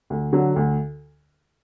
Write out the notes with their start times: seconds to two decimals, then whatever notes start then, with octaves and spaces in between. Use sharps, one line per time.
0.10 D2
0.33 D3 F#3
0.56 D2